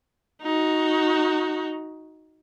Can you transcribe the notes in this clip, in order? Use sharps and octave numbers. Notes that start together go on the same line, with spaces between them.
D#4 F#4